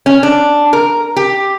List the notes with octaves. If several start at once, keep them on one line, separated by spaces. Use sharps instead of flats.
C#4
D4
A#4
G4